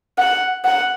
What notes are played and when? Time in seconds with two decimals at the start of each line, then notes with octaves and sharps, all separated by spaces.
0.18 F#5
0.65 F#5